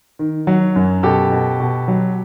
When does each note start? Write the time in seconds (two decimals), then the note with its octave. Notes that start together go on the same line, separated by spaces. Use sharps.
0.19 D#3
0.47 F#3
0.76 F#2
1.03 B2 G4 A4
1.32 B2
1.60 B2
1.88 F#3